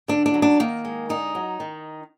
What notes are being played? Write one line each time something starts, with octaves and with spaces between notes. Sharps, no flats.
D3 D4
D4
F#3
D4
D#3 A#3
G#3
D3 D#4
F#3
D#3